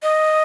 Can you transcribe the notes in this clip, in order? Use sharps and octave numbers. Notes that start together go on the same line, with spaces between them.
D#5